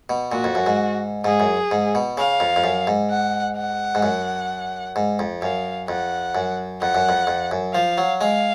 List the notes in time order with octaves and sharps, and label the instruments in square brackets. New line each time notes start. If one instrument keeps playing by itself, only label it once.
[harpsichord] B2
[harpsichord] A#2 [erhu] F#4
[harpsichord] F2
F#2
G#2
[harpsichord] G#2 [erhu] G#4
[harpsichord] F#2
G#2
B2
[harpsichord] C#3 [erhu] F5
[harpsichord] F2
F2
F#2
G#2
[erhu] F#5
F#5
[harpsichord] G#2
F#2
G#2
F2
[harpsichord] F#2 [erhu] F5
[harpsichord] F2 [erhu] F#5
[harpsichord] F#2
[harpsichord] F2 [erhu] F#5
[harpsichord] F#2
F2
F2
F#2
[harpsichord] F3 [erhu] F5
[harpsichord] F#3
[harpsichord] G#3 [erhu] F5